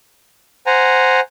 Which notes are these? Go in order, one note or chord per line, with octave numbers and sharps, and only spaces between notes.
C5 F#5 G#5 A#5